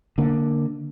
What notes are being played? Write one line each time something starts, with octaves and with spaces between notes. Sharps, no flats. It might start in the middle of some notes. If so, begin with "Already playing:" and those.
D3 A#3